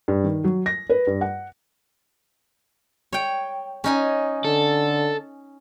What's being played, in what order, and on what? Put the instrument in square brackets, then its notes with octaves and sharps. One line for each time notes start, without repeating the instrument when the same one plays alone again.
[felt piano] G2
D#3
F#3
A#6
B4
G2
F#5
[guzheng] C#5 G5
C#4 D#4 G#5
[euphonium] D3 [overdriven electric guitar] A4